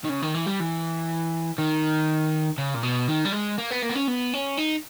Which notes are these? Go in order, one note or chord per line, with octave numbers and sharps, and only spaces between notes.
D#3
C#3
D#3
E3
G3
E3
D#3
C#3
A#2
B2
D#3
G3
G#3
A#3
B3
A#3
B3
C#4
B3
C#4
D#4